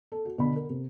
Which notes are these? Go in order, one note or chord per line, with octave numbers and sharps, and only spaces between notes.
A4
F#4
B2 D3 B5
A#4
C3